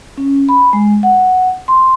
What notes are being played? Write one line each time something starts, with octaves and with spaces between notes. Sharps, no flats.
C#4
B5
G#3
F#5
C6